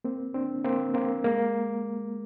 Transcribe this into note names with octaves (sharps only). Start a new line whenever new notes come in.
A#3 C4
C4 D4
A#3 C4
A#3 C4
G#3 A#3